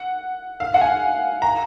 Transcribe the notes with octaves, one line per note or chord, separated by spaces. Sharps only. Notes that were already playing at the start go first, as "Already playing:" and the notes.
Already playing: F#5
F5
F#5
G#5
A#5